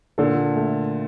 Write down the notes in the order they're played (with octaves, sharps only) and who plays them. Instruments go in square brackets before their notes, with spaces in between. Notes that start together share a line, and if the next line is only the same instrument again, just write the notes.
[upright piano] A#2 D3 [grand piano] A4
[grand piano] A3